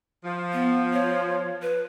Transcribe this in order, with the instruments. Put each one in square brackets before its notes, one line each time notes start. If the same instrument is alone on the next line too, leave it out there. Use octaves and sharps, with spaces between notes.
[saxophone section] F3
[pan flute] B3
C#5
B4